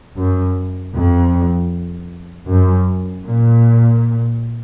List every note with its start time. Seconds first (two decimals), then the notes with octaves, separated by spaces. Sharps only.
0.19 F#2
0.95 F2
2.48 F#2
3.26 A#2